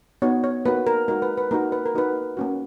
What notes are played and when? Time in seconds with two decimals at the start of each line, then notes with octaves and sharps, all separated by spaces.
0.22 B3 D#4 F#4 C#5
0.44 C#5
0.66 A#3 D#4 F#4 B4
0.87 A#4
1.08 G#3 D#4 F#4 A#4
1.22 B4
1.37 B4
1.51 A#3 D#4 F#4 A#4
1.72 B4
1.86 A#4
1.94 A#3 D#4 F#4 B4
2.37 A#3 C#4 F#4